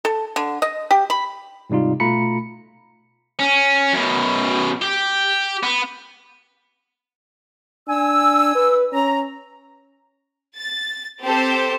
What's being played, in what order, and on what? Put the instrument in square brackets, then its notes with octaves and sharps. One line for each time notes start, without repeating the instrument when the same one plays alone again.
[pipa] A4
D3
D#5
G4
B5
[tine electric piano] G#2 C3 G3 D#4 F4
B2 A3 F4 A#5 B5 C#7
[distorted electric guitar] C#4
F#2 B2
G4
B3
[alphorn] D4 [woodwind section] G#5 E6
[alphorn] B4
[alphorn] C#4 [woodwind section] A#5
[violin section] A6
C4 G4 A4 C5 A5